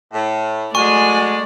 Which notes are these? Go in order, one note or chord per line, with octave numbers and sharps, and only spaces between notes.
A2
F#3 G#3 A3 D5 G#5 C#6